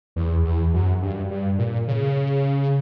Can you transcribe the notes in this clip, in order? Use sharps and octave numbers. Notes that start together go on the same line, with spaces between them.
E2
E2
F#2
G2
G2
A#2
C#3